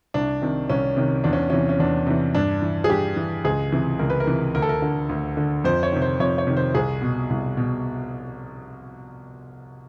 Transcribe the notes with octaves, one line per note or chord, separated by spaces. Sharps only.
C2 D4
C3 D#3
C2 C#4
C3 D#3
E2 D4
C#4
C3 E3 C#4
C#4
E2 D4
C3 E3
G2 D4
E3
G#4
G2 G4
E3
C#2 G#4
C3 E3
C#2 A#4
B4
A#4
C3 E3
D2 A#4
A4
A#4
D3
D2
D3
F2 C5
C#5
C3 D#3
C5
F2 C#5
C#5
C3 D#3
C5
C2 G#4
B2
C2
B2